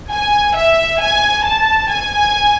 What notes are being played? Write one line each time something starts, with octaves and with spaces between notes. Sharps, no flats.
G#5
E5
G#5
A5
G#5